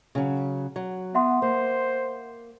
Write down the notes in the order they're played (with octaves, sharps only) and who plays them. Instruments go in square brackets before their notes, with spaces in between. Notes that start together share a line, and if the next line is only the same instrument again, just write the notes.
[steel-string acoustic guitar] C#3 F#3
F#3
[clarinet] B3 [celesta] E5 F#5 C6
[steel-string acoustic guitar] A#3 [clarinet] C5